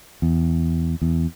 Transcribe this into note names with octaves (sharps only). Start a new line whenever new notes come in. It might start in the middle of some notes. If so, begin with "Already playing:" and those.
E2
E2